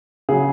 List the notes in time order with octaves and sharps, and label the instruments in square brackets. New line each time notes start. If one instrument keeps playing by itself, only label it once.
[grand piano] C#3 F#3 G#4